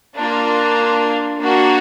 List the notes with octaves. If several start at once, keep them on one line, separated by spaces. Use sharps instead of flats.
A#3 D4 F4
A#3 D4 F#4